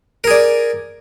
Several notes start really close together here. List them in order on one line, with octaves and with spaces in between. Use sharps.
A#4 G#4 D5